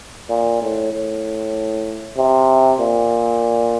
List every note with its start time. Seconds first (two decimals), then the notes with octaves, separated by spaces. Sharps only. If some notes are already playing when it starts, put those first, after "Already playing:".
0.29 A#2
0.61 A2
0.92 A2
2.17 C3
2.79 A#2